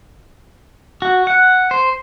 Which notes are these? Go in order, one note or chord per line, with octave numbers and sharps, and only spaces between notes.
F#4
F#5
C5